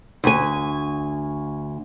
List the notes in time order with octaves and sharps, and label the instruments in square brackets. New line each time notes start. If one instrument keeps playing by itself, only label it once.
[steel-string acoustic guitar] D2 G#5